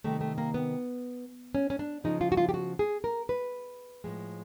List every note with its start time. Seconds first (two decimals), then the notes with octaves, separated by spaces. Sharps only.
0.04 C3 D#3 G3 A3
0.21 A3
0.38 A#3
0.54 B3
1.55 C#4
1.70 C#4
1.79 D4
2.04 C#3 F3 G#3 D#4
2.21 F4
2.32 F#4
2.37 F4
2.49 G4
2.54 F#4
2.79 G#4
3.04 A#4
3.29 B4
4.04 A2 F3 G#3